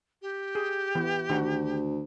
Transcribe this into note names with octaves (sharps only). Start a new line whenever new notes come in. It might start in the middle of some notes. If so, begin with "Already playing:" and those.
G4
G#4
E3 B3
D2 D#3 F#4